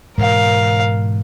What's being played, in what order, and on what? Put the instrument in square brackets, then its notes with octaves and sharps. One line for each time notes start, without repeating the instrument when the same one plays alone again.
[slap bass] G#2 B2 E3 [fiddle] A#4 F5